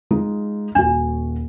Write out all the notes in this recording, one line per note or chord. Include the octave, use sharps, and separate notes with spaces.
G#3 D#4 F4
D#1 D4 F#4